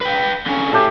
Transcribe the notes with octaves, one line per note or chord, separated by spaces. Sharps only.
B4 G5
D3 C#4
A2 G4 A4